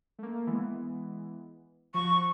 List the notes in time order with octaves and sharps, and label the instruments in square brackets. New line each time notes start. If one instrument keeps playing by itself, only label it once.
[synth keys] A3 A#3
E3 G#3 B3
[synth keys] F3 [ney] C#6